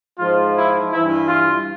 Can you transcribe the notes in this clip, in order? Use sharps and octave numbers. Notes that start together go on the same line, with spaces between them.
G#2 F3 F4
E4
G2 E3 E4
F4